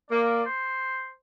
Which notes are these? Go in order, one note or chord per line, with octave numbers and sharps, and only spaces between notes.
A#3 D5
C5